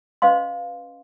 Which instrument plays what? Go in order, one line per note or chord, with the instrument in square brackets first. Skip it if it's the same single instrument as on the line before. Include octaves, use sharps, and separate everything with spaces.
[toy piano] C#4 B4 D#5 F5 C6